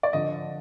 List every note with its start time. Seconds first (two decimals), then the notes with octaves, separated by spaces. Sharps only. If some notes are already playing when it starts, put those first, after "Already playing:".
0.03 D5
0.13 D3 F3 D#5